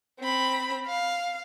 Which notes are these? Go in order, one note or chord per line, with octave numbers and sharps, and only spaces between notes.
C4 B5
F5